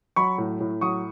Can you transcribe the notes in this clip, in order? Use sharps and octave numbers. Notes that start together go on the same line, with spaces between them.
F#3 B5 C#6
A2
A2
F#3 C#6 D#6